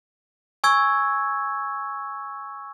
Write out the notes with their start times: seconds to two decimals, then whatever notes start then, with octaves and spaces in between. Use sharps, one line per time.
0.64 G#5 C#6 E6 G#6